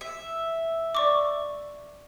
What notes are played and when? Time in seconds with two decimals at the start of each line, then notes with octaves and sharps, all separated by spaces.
0.01 E5
0.95 D5 C#6 D6